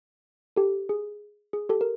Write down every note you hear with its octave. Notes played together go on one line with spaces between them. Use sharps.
G4 A4
G#4
G#4
G4 A4
A#4